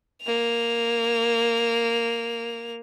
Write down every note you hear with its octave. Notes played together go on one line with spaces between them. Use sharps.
A#3 F7